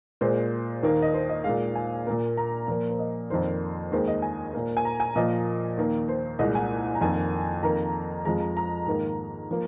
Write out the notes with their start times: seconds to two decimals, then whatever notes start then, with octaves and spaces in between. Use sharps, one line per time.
0.21 A#2 G#3 C5
0.83 D#2 D#3 A#3
1.02 D#5
1.14 C5
1.29 D#5
1.44 G#3 F5
1.49 A#2
1.75 G#5
2.07 A#2 A#3
2.37 A#5
2.68 A#2 F3 A#3
2.90 C5
2.99 D#5
3.30 F2 D#3 A#3 C5
3.91 D#2 D#3 G#3 C5
4.08 D#5
4.22 G#5
4.53 A#2 A#3
4.77 G#5
4.85 A#5
5.00 G#5
5.16 A#2 F3 A#3 D#5
5.77 D#2 D#3 A#3
6.08 C5
6.39 C2 A#2 G#3 D#5
6.55 G#5
6.95 A#5
7.01 F2 D#3 A#3 G#5
7.63 F2 D#3 A#3 A#5
8.25 F2 F3 G#3 A#5
8.41 A#5
8.57 A#5
8.87 G#2 D#3 A#3
9.51 F3 A#3